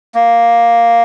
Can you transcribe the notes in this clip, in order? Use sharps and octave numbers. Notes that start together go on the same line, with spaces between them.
A#3